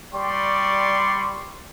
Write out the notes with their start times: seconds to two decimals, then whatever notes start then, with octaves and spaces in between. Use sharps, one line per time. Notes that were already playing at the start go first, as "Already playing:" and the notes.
0.13 G3 D5 G5 C6 C#6